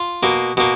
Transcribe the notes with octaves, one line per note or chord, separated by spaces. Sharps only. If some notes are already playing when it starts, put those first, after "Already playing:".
Already playing: F4
B2 A#3
B2 A#3